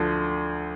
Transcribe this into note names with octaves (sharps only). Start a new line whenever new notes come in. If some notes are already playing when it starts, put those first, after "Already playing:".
Already playing: D2 D3 F3